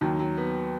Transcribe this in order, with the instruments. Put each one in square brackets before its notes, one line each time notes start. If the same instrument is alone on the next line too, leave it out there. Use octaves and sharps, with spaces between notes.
[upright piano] D#2 D#3 [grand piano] F#3
[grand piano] F#3
B3